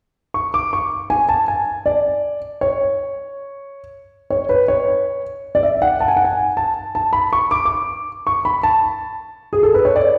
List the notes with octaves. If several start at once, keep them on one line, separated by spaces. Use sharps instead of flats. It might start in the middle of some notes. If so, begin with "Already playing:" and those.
C#6
D6
C#6
G#5
A5
G#5
D5
C#5
C#5
B4
C#5
D5
E5
F#5
A5
G#5
F#5
G#5
A5
A5
B5
C#6
D6
D6
C#6
B5
A5
G#4
A4
B4
C#5
D5